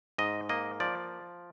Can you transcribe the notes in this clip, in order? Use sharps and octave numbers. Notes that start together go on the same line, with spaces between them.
G#2 D#5
A#3 D#5
F3 D5